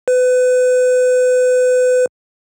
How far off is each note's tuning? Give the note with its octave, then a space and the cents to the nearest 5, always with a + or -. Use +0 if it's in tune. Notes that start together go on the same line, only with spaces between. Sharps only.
B4 +30